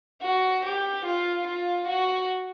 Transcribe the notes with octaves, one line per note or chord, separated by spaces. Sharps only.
F#4
G4
F4
F4
F#4